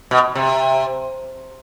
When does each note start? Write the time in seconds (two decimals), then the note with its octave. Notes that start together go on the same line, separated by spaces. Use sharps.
0.11 B2
0.35 C3